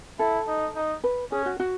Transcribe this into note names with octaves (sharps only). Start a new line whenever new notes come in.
E4 A4
D#4
D#4
B4
C#4 G#4
F#4
F#4